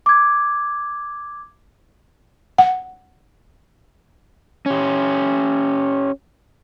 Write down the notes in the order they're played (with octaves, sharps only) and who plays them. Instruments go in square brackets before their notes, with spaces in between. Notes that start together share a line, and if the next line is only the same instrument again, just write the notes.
[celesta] D6 G#6
[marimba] F#5
[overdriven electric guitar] C#4 G4